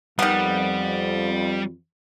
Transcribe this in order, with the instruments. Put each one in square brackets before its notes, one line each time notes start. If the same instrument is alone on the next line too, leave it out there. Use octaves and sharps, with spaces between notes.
[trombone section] F2 [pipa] D#3 B3 [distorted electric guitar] G3